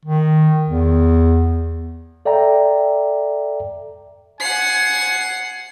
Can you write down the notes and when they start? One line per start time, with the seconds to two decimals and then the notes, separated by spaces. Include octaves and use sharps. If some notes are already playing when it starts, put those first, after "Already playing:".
0.05 D#3
0.69 E2
2.25 A4 D5 E5 G5 A#5
4.40 F#5 G#5 C7